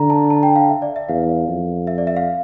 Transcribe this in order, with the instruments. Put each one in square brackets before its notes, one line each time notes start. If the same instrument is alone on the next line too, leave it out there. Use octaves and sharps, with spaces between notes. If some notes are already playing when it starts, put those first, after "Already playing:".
Already playing: [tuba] D3 [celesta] A#5
[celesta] A5
A5
G5
F5
E5
D5
E5
[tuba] E2 [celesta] F5
[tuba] F2
[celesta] E5
D5
E5
F5